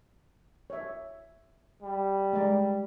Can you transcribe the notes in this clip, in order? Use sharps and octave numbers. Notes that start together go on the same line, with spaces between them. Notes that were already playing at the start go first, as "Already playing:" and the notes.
C#5 E5
G3
G#3 D5 A#5